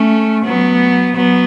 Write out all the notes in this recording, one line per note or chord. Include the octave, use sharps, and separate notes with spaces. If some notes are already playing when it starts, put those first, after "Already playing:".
Already playing: A3 C#4
F#3 B3
F#3 B3